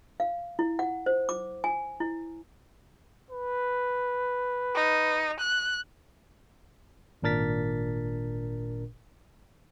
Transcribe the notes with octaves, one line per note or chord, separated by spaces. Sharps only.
F5
E4
F#5
C5
D6
G#5
E4
B4
D#4
F#6
G#1 A#2 D4 A#4 A6 B6